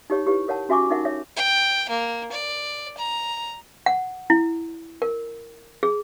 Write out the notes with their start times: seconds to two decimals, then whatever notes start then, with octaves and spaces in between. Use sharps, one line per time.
0.10 D#4 G4 C#5
0.26 E4 G4 B4 C#5
0.48 A#4 C#5 F#5 A5
0.69 C#4 F#4 E5 G#5 C#6 D6
0.90 D4 D#4 A#4 E5 F#5
1.05 C#5 E5
1.36 G5
1.89 A#3
2.32 D5
2.97 A#5
3.86 F#5
4.30 E4
5.02 A#4
5.83 G#4